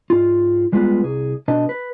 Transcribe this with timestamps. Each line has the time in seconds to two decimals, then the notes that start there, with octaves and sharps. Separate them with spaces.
0.10 G#2 F4
0.72 G3 G#3 B3 F4 B4
1.03 C2 G#4
1.48 B2 D4 B4 D#5 A5
1.69 B4